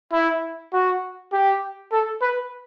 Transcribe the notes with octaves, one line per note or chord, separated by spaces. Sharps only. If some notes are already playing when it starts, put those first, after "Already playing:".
E4
F#4
G4
A4
B4